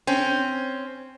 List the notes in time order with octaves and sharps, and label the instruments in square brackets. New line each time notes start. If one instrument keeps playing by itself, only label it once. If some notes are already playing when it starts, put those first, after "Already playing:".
[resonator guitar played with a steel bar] C4 C#4